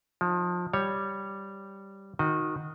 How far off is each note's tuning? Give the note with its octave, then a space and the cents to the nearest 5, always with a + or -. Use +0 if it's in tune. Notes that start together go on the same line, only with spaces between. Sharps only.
F3 +25 D#4 +0
G3 +0 C#5 +0
D#3 +0 F#4 -20 D#5 +0